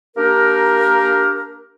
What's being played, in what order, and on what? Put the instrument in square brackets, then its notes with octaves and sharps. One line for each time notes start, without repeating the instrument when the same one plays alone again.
[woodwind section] A#3 D4 G4 A#4